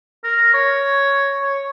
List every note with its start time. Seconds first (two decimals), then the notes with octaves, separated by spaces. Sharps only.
0.24 A#4
0.54 C#5
1.42 C#5